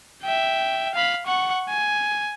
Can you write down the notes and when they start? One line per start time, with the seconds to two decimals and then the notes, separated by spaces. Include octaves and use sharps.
0.23 E5 G5
0.95 F5 B5
1.26 F#5 C#6
1.69 G#5